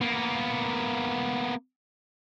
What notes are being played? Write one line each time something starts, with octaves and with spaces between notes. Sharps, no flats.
A#3 B3